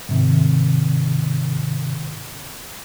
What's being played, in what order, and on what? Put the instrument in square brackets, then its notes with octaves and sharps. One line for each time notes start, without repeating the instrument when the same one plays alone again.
[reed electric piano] G#2 C3 D#3